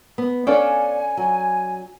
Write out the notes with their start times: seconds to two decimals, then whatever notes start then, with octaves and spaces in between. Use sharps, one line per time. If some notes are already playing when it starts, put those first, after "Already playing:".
0.18 B3
0.47 C#4 D4 A4 D5 F5 G#5
1.17 F#3